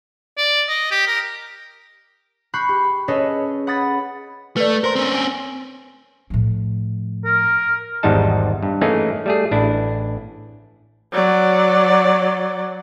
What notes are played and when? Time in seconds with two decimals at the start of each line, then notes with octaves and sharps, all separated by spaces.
0.38 D5
0.69 D#5
0.91 G4
1.07 A#4
2.54 B5 C#6 F#6 G6 C7 C#7
2.69 G4
3.08 C#4 G#4 A4 B4 C#5 D#5
3.67 F#5 B5 D#6 G#6 A6 B6
4.56 A3 B4 D5
4.84 A#4 C5 C6
4.96 C4 C#4
5.15 G#5
6.30 A2 F3
7.25 A#4
8.03 G#1 E2 G#2 G3 D#4 A5
8.63 G2
8.81 E3 A3 A#3 C#4 D#4 G#4
9.26 G3 A3 G#4
9.51 A1 D4 E4
11.13 F#3 D5